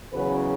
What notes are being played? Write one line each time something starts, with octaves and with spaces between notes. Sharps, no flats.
E2 C#3 F#3 C#4 B4